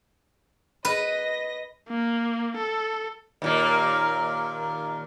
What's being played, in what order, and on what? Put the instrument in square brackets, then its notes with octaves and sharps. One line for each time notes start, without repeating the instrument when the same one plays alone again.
[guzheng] B4 [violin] D#5 A#6
[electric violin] A#3
A4
[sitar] D#2 A#2 A#3